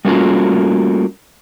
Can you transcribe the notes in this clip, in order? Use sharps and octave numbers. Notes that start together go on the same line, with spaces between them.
G3 A3 A#3 C#4 F4 F#4